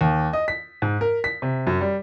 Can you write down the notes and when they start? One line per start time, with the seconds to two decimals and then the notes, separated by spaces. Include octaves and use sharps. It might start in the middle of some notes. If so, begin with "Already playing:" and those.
0.01 D#2
0.33 D#5
0.48 B6
0.82 G#2
1.01 A#4
1.24 B6
1.42 C3
1.67 F#2
1.81 G3